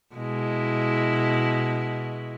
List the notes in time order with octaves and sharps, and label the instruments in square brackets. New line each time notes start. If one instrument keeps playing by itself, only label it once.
[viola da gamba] B2 G#3 E4